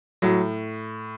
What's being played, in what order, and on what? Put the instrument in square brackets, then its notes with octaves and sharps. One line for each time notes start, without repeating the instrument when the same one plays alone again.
[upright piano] A2 F#3